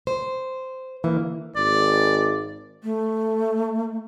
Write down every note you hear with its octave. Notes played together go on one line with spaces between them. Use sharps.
C5
E3 A#3
G#1 D5
A3